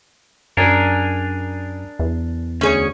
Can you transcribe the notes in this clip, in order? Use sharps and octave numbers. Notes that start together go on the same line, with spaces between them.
F#2 D4 G#4 A#4
E2
D2 C#4 G#4 C#5